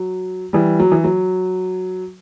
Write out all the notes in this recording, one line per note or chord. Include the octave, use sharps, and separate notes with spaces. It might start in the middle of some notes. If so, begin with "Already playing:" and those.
Already playing: F#3
E3 G3
F#3
E3
F#3